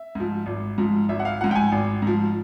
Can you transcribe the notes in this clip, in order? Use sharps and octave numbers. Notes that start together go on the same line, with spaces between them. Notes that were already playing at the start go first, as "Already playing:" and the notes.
Already playing: E5
G#2 F3
G#1
G#2 F3
G#1 E5
F#5
F5
G#2 F3 F#5
G5
G#5
G#1
G#2 F3